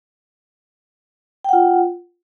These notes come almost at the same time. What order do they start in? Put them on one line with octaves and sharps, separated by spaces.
G5 F#5 F4